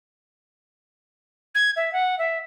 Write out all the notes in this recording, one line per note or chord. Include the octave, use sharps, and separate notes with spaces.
G#6
E5
F#5
E5